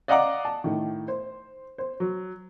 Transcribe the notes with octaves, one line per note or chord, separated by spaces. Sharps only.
D5 D#5 F5 F#5 A#5 D6
A5
A2 D#3
C5
C5
F#3